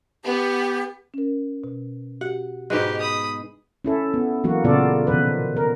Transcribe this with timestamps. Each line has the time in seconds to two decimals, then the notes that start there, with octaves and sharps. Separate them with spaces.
0.25 B3 G4
1.14 C#4 A#4
1.64 B2
2.21 F#4 G4 F#5
2.70 G#2 B2 G#3 G4 B4 F#6
3.01 B5 D#6
3.85 C#4 E4 A4
4.14 B3
4.44 E3 F#3 A#3 F#4
4.64 A#2 C#3 B3 F4 A4 D5
5.07 B2 D#3 F3 B4
5.57 A#4